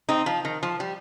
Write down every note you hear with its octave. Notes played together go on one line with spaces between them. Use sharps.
C4 D#4
F3
D#3
F3
G3